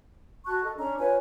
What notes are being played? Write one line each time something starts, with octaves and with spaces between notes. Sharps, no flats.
F#4 A5 C#6 F#6
A4 D#5
C#4 D4 A#5
F4 B4 C#5 G#5